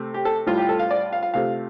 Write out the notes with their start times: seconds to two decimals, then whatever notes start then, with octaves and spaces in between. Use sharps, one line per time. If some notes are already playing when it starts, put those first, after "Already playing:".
Already playing: C3 A3
0.14 G4
0.25 A4
0.46 A2 G3 F4
0.58 G4
0.69 A4
0.79 F5
0.91 D5
1.13 F5
1.23 F5
1.34 C3 A3 F4 F5